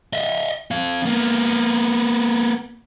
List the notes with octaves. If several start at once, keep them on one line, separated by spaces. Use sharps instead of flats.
D#5 E5
C4 F5
A#3 B3